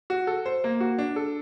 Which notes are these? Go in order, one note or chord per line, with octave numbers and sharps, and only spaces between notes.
F#4
A4
C5
A#3
F#4
D4
A4